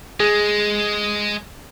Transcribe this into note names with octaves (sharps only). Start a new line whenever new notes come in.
G#3 G#4